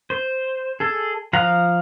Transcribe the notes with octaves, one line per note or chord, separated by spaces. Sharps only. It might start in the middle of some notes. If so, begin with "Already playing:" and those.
C5
G#4 A4
F3 F5 F#5 A#5